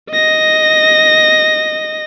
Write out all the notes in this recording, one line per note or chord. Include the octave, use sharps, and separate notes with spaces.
D#5 A#6